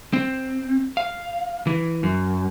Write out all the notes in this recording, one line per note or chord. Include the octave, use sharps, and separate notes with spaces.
C4
F5
E3
F#2